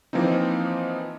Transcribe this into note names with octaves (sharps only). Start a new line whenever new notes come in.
E3 F3 A#3 C4 D#4